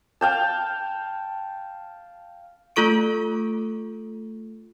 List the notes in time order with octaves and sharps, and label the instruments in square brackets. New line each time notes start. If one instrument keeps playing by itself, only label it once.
[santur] F5 G5 A5
[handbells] A3 F4 A4 C#6 D7